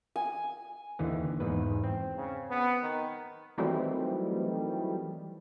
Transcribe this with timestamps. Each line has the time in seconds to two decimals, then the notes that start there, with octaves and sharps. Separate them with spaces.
0.16 G#5
0.99 D#2 D3 E3
1.40 E2 G#2 B4
1.84 C4
2.16 C#3
2.50 B3
2.82 D#3
3.58 D#3 E3 F#3 G3 A3 C4